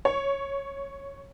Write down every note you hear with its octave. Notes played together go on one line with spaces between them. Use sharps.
C#5